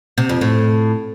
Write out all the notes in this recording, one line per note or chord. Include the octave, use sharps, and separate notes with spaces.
C3
F2
A2